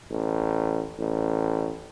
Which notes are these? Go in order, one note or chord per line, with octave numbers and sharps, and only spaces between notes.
A1
A1